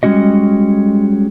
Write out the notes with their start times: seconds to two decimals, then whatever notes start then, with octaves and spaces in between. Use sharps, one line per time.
0.03 G3 G#3 C#4 F#4 D#5